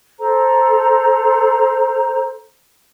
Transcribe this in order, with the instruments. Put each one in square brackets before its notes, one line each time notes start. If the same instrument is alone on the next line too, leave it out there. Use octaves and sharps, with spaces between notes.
[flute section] A4 C5 A#5